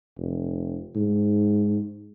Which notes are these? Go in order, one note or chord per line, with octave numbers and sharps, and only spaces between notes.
F1
G#2